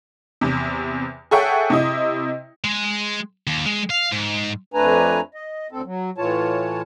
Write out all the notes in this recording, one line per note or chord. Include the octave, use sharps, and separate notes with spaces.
E2 C3
G#4 A4 C#5 E5 F#5 G5
C3 E4 D#5
G#3
D#2
G#3
F5
G#2
F2 A3 D4 B4 G#5 A#5
D#5
D2 C4 A4
F#3
A2 E3 F4 C#5 A5